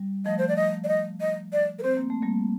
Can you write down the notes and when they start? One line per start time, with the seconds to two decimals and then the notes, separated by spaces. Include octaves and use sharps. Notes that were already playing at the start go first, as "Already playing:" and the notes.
Already playing: G3
0.25 F3 A3 D#5
0.38 C5
0.48 D5
0.56 D#5
0.84 D5
0.88 D#5
1.21 D#5
1.53 D5
1.79 A#4
1.83 C4 C5
1.97 A#3
2.10 A3
2.22 G3 A#3